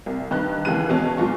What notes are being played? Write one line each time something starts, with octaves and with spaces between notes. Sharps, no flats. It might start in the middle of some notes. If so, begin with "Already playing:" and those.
C2
G2 D#3 D#4 B4 F#6
D#2 C#3 E3 G#3 F#6 D#7
E2 B2 G#3 C#4 A5
A#2 F#3 G#3 F4 C#6